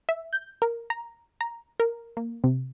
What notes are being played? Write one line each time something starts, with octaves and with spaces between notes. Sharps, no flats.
E5
G6
A#4
A#5
A#5
A#4
A#3
C3